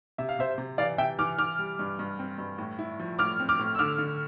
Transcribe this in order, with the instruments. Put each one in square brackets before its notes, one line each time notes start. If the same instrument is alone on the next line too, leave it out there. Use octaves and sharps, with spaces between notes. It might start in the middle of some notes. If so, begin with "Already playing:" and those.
[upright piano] C3 [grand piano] E5
[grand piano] F5
[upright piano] C3 [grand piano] C5 E5
[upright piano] C3
[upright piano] E3 [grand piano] D5 F5
[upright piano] C3 [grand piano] E5 G5
[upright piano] E3 [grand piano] D6 F6
[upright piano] E3 [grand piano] D6 F6
[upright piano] G3
G2
G2
C4
G2
A2
E4
F3
[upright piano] A2 [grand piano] D6 F6
[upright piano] C4
[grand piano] D6 F6
[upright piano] A2
[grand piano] E6
[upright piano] D3 [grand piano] D6 F6
[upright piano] D3